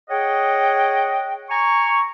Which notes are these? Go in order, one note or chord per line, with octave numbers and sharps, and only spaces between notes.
G#4 C#5 D#5 F#5 G5
G#5 A#5 C#6